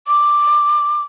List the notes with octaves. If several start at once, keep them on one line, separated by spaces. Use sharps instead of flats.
D6